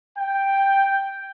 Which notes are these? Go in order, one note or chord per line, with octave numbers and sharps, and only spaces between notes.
G5